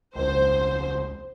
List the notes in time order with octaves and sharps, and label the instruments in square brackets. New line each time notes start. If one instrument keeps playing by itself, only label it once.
[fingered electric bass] E1 C#3 [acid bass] C#2 [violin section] C5